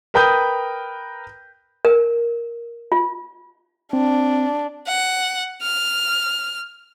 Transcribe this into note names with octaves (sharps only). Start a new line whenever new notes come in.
A#4 B4 G5 B5 D#6 G6
A#4
F4
C4 D4
F#5
F6